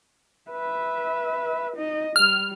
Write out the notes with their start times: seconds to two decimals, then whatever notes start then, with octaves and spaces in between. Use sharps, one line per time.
0.51 B4 E5
1.76 D#4 D#5
2.16 G3 F6